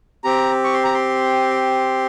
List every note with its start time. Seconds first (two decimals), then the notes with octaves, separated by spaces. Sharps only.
0.24 C4 G4 A#5
0.64 C#6
0.73 C6
0.84 A#5
0.94 C6